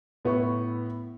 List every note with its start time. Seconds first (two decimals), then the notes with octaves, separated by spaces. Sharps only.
0.25 A2 B3 E4 C#6